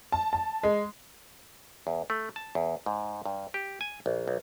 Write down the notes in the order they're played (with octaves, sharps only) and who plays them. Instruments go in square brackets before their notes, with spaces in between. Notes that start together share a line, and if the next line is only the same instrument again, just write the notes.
[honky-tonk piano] A5
A5
G#3
[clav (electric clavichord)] E2
A3
A5
E2
G#2
G2
G4
G#5
A#1
B1